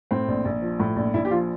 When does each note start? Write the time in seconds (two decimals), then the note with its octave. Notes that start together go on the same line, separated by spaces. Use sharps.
0.11 A2 C4
0.28 A#1
0.45 A#1
0.62 F3
0.79 A2
0.96 A#1
1.14 A#1 E4
1.25 G4
1.31 F3 F4